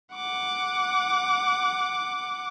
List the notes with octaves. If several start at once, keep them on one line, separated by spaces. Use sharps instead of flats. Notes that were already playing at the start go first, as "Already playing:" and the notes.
F#5 D6